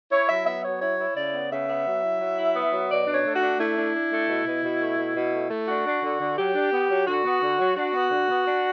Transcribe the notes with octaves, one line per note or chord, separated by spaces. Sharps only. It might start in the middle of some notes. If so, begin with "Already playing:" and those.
E4 C#5
F#3 E5
B3 E5
F#3 C#5
E4 C#5
E4
C#3 D5
B3
C#3 E5
B3
F#3
E4
F#3
E4
B3
F#3
B2 D5
D4
C#5
A3
F#4
D4
A3 E4
D4
D4
A3
B2
B2
B2
A3
B2
B2
A3
A3
D4 F#4
D4
D3
D3
F#3 G4
D4
B3
F#3
D3 F#4
B3
D3
F#3
D4 F#4
B3
D3
B3
D4